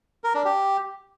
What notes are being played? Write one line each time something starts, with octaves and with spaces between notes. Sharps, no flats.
A#4
D4
G4